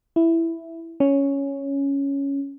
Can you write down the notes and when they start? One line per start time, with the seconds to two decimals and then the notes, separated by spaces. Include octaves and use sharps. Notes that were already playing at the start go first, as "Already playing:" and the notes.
0.16 E4
1.00 C#4